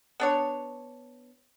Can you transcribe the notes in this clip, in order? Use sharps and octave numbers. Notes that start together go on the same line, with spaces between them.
B3 D4 C#5